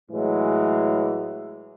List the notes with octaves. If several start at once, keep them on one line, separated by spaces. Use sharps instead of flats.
A2 E3 F#3 G#3